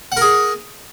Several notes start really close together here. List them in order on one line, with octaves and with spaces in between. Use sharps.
F#5 A#4 G#4